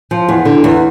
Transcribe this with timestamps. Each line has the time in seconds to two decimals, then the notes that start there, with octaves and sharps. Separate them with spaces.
0.11 F3
0.29 E2
0.45 D3
0.64 E2